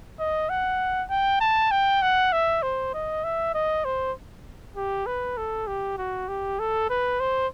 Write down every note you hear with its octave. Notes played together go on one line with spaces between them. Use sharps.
D#5
F#5
G5
A5
G5
F#5
E5
C5
D#5
E5
D#5
C5
G4
B4
A4
G4
F#4
G4
A4
B4
C5